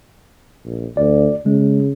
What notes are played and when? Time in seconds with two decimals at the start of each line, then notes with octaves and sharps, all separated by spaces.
0.65 A#1
0.97 D2 D5
1.46 C#3 G#3